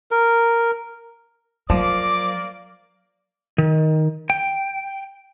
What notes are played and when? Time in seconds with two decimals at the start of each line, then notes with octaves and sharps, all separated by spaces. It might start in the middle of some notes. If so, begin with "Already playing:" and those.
0.11 A#4
1.70 F3 F#3 A#3 D5 D6
3.58 D#3
4.30 G5